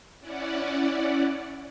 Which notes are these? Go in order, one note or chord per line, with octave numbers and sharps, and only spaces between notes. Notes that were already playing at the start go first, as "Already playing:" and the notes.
C#4 E4 D5 F#5